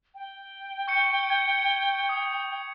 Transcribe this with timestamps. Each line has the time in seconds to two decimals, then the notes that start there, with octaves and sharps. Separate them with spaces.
0.15 G5
0.88 C#6 G6 C#7
1.30 G#6
2.09 D#6